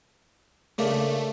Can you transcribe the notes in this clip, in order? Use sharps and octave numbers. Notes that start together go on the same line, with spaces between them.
C#3 A3 A#3 D4